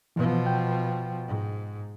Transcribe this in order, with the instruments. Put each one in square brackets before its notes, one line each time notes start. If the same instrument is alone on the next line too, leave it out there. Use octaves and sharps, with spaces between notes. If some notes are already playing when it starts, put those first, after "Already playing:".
[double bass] B2 F3 [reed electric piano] E3 B3
[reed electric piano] G5
[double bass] G#2